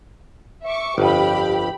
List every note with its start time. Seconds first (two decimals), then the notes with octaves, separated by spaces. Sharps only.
0.65 E5 C#6 D6
0.98 G1 F2 G4 B5